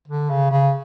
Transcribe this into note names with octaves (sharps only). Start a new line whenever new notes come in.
D3
C#3
C#3